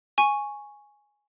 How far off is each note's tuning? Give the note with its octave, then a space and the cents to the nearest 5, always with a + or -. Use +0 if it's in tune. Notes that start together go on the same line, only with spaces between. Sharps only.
G#5 +0 C#6 +0